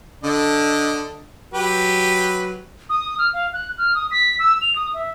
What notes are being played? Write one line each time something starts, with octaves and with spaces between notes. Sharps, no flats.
D3 A4 D#5
F#3 G4 B4
D#6
F6
F5
F#6
F6
D#6
B6
E6
F7
D#6
E5